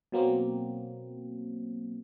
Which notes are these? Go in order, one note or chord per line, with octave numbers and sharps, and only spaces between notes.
B2 F#3 A#3 C4